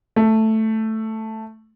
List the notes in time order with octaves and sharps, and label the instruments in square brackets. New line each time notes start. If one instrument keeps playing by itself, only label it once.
[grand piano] A3